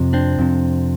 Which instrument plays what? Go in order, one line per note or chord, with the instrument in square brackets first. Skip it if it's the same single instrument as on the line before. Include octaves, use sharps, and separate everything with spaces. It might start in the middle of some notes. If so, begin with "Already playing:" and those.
Already playing: [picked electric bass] F2 C3
C4 D4
F2 C3